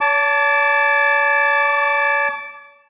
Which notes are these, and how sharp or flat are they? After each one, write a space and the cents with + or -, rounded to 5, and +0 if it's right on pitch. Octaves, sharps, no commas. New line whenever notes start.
C#5 +40 A5 +0 D6 -20